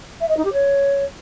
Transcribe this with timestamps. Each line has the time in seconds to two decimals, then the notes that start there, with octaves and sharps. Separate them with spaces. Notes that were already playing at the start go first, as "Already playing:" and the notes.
0.21 E5
0.29 D#5
0.37 D#4
0.45 G4
0.53 C#5